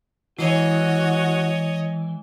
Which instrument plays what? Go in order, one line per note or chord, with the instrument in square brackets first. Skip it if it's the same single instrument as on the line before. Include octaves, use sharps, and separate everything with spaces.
[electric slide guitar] E3 [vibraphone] G#3 G#5 [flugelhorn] F#4 [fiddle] C#5 D#5